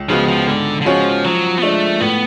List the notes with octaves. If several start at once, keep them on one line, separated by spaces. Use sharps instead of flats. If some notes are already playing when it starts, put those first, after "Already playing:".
Already playing: C#2
C#3 F3 G#3 B3 F#4
F3
G#2 D3
D3
F3 G#3 C#4 F#4 C#5
F3 F#3
B3
G#3 A3 D4
A2 B3